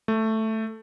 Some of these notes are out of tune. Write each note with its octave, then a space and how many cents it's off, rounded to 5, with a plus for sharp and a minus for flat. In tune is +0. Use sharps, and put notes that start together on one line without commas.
A3 +5